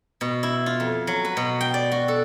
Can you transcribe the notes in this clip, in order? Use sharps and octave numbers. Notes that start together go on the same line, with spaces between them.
B2
E4
F4
F2
F#3
B4
B2
G5
D5
F#4
A4